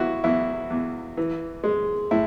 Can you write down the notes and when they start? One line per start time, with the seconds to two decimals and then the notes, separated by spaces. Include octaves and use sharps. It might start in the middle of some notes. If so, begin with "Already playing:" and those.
Already playing: E2 E4 F#4
0.24 E2 E4
0.70 E2
1.17 E3
1.64 G#3
2.11 A2 E4